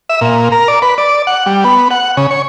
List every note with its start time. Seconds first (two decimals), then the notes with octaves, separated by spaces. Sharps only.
0.10 E5
0.21 A#2
0.52 A#4
0.68 D5
0.82 B4
0.98 D5
1.27 F#5
1.46 G3
1.64 B3
1.91 F#5
2.17 C#3
2.31 C#5